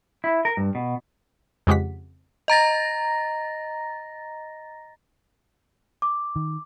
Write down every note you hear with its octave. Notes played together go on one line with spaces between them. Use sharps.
E4
A#4
G2
B2
F2 C#3 G#3 G4 F#5 B6
D#5 A#5 A6 A#6
D6
D#3